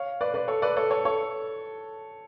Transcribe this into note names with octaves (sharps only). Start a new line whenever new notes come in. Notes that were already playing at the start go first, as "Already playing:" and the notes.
Already playing: C#5 F5
B4 D5
B4 D5
A4 C#5
B4 D5
A4 C#5
A4 C#5
A4 C#5